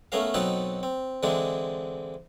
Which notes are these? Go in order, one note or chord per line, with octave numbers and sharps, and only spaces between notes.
A3 B3 C#4 A#4 F5
B2 F#3 C4 D#4 A4 B4
C4
D3 E3 G#3 C4 D4